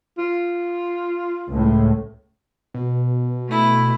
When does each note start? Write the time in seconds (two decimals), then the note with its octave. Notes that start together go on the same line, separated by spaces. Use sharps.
0.18 F4
1.48 C#2 A2
2.74 B2
3.49 A3 E4